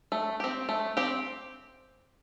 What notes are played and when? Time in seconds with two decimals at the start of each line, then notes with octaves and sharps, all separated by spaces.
0.12 A3
0.40 C4 G4
0.69 A3
0.97 C4 G4